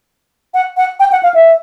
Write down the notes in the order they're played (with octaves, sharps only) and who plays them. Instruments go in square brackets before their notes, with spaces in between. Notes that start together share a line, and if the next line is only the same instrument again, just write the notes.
[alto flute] F#5
F#5
G5
F#5
F5
E5